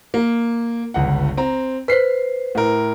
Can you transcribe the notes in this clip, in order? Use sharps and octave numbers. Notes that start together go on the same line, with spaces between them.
A#3
G1 C#2 F#5
C4 A#5
B4 C5 B6 C7
A2 A#4